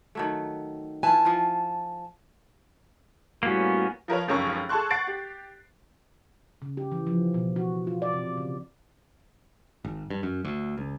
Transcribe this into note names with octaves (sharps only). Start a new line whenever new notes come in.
D#3 F#3 A3
E3 F4 G#5 A5
F3 F4
A2 G3 A#3 B3 C#4 F#4
F3 A#4 B4 C#5
F1 C#2 F#2 C#4 A#4 C#6
G#4 A4 A5 C6 C#6 F#6
F#5 C#6 A6 C7 D7
G4
C#3
G4
E3
F3
B2
F#4
F4
D5
C3
C#3
G#1
G2
F#2
D2
C#2